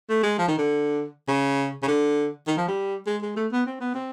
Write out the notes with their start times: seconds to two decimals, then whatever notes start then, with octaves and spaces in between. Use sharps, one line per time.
0.09 A3
0.23 G#3
0.39 F3
0.48 D#3
0.58 D3
1.28 C#3
1.83 C#3
1.88 D3
2.47 D#3
2.57 F3
2.68 G3
3.07 G#3
3.22 G#3
3.36 A3
3.52 B3
3.66 C4
3.80 B3
3.94 C4